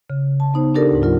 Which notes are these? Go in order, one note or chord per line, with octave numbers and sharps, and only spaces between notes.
C#3
A5
B3 D#4 C5
D4 D#4 G4 A4 A#4 D5
D2 G#2
F#3 F4 A#4